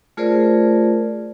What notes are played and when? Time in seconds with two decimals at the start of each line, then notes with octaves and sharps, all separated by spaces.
0.17 A3 F4 G#4 A#4 C5 D5